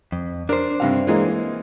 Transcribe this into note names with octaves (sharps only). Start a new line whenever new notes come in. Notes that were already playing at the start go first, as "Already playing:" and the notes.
F2
D4 A#4 C5
G2 C3 F5
E3 G#3 A#3